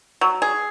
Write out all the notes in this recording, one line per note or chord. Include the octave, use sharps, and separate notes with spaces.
F#3
G#4